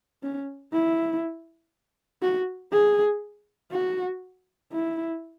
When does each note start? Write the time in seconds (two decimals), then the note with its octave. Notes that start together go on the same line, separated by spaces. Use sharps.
0.23 C#4
0.72 E4
2.22 F#4
2.72 G#4
3.71 F#4
4.72 E4